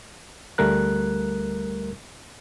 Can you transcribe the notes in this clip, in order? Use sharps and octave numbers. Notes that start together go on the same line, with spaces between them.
D2 G3 A3 A#4 F#6